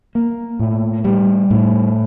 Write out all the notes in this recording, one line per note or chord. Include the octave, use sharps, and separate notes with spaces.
A#3
A2
G3
A2